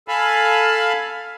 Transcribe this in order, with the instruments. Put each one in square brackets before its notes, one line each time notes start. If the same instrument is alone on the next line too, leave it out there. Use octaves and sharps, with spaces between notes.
[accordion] A4 F5 G#5 A5 B5